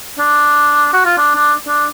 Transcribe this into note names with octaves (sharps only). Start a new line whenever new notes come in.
D4
F#4
F4
D4
D4
D4